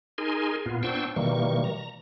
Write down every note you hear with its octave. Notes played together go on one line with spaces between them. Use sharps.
D#4 G#4 A#4 G#5 C6
A#2 B3 F4
B3 D4 C5 G5 C#6 E6
B2 D#3 E3 G3 A#3 C#6
A#5